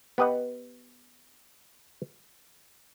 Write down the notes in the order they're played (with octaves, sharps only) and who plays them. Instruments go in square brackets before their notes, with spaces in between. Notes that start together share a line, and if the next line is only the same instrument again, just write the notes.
[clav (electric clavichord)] B3 G4 B4 D#5 F#5